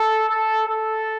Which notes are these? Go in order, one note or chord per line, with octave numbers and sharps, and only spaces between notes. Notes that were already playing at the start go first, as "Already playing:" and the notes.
Already playing: A4
A4
A4